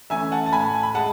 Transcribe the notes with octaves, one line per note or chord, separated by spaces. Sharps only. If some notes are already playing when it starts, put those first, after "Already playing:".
E3 A3 C#4 E5 G#5
F#5 A5
A5
A2 G#5 B5
B5
G#3 F#5 A5